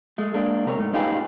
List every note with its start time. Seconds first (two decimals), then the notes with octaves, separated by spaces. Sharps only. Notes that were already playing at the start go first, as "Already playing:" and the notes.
0.18 G#3 A3
0.34 G#3 A#3 D4
0.66 C3 A#4 B4 C#5
0.78 G#2 A3
0.93 C#4 D#4 F4 G4 G#4 B4